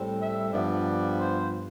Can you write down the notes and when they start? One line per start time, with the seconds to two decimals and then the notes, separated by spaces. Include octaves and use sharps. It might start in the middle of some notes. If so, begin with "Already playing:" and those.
Already playing: A2 G3 C4
0.20 E5
0.53 G2 F3 B3 D5
1.18 C5